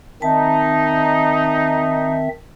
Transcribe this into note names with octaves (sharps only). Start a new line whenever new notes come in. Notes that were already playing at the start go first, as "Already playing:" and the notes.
D#3 C4 D#4 E5 A5